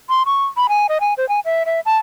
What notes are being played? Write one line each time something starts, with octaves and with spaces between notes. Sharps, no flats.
C6
C#6
B5
G#5
D#5
G#5
C5
G#5
E5
E5
A5